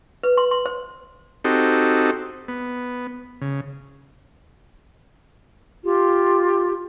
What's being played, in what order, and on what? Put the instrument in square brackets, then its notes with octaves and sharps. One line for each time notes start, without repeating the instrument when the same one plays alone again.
[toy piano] B4
C6
C6
C5
[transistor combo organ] C4 D#4 F#4 G4 A4
B3
C#3
[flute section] F4 G4